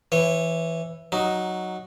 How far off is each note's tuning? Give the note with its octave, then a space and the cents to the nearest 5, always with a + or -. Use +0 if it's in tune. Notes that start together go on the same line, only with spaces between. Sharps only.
E3 +5 C#5 -25
F#3 +0 D#4 +0